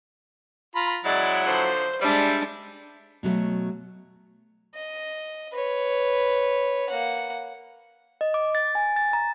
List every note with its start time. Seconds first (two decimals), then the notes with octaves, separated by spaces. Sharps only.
0.75 F4 A#5 B5
1.05 C#3 F#3 G#3 E4 D5 F#5
1.44 D3 F3 A3 C5
2.02 G3 G#3 D4 E5
3.23 B2 F#3 G#3 A3
4.75 D#5
5.53 B4 C#5
6.90 A#3 F#5
8.21 D#5
8.34 D6
8.55 A6
8.75 G#5
8.96 A6
9.13 A#5